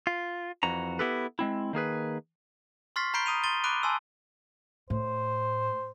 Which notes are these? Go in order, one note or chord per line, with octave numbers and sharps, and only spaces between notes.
F4
F2 E3 F#4 A#5
B3 E4 G4 A4 B4
G#3 C4 E4
D#3 A#3 G#4 B4
C6 C#6 F6 A6 B6 C7
A#5 B5 G6 C7 D7 G7
A#5 D#6 D#7 F7
C6 A6 D#7 G7
B5 D6 F#6 D7 D#7 G7
G#5 A5 C6 E6
A2 C5